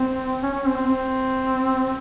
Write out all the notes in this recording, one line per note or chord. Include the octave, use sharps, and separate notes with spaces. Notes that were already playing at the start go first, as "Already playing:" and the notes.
Already playing: C4
C#4
C#4
C4
C4
C4